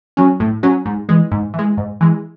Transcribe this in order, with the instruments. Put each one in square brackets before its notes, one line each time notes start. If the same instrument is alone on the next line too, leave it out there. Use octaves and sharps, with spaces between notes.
[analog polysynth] F#3 C#4
A2
F#3 C#4
G#2
E3 G#3
G#2
E3 G#3
G#2
E3 G#3